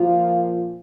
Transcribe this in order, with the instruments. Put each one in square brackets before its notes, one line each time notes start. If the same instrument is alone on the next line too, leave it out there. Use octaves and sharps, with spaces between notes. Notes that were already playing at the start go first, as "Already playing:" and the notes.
Already playing: [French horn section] A#2 F3 F4